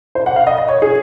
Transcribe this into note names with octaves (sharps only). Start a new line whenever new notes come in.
C5
F#5
F5
D#5
D#5
C#5
G#4